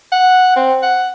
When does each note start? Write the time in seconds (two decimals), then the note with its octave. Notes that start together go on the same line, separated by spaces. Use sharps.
0.12 F#5
0.56 C4
0.83 F#5